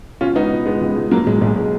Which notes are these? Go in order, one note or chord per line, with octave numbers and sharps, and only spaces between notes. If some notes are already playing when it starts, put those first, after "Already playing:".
B2 C#4 F4
C#2 B3 D#4
B2
C#2 G#3 B3
C#2
C#2
B2 F#3 A#3
B1 G#3
B1 G#3
B2 G#3